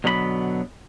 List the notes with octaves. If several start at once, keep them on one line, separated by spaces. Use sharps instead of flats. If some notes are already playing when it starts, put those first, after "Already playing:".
B2 D3 F#3 B3 C5 B5